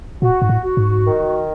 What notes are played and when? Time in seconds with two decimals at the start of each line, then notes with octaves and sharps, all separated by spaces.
0.22 A#2 F#4
0.42 G#2
0.49 A2
0.64 F#4
0.77 G#2
1.05 D#3